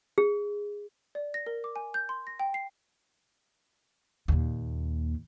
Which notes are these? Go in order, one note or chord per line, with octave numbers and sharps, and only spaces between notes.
G#4
D5
A#6
A#4
D6
G#5
G6
C6
A#6
G5
C7
D#2 A#2